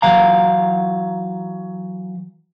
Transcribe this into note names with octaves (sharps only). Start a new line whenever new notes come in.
E3 F#3 F5 A#5